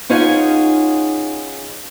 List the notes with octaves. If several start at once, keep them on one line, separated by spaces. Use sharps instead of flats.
C#4 D#4 F4 G#4 F#5 G#5